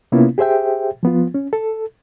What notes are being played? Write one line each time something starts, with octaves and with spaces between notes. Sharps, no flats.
C3 A#3 B3 C#4 E4 F4
G4 G#4 C5 E5 G5
F3 B3 F4
C#4
A4